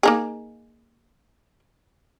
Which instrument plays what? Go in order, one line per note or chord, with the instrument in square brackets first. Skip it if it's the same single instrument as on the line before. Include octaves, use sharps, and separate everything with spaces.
[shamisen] A#3 D#4 G#4